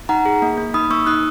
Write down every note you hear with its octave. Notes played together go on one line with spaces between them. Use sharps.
D#4 F#5 A#5
G#4
A#3
A#3
D#4 B5 D#6
A#3 C#6 E6
D#4 D#6 F#6